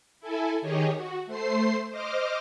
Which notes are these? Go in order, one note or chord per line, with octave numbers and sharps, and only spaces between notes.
E4 A4 G#5
D#3 G4 G#4 C#5 D#5
F#4
A3 C5 C6 C7
C5 D#5 D6 F6